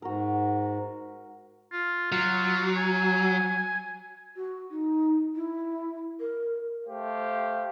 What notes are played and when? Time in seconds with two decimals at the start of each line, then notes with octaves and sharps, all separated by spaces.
0.02 G#2 F#4 A#4
1.72 F4
2.12 F#3 F4
2.77 G#5
4.36 F#4
4.70 D#4
5.35 E4
6.20 A#4
6.87 A3 G4 C5 F5